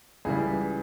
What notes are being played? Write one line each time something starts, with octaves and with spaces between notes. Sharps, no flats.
C#2 C#3 E3 G3 G#4